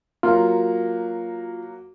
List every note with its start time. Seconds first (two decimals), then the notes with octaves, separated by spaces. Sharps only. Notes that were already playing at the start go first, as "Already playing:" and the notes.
0.23 F#3 A#3 F4